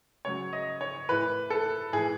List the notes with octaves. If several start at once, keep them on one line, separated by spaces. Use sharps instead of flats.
C#3 F#3 C#5
D#5
C#5
A2 E3 B4
A4
A2 E3 G#4